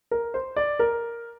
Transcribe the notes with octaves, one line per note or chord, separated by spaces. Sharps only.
A#4
C5
D5
A#4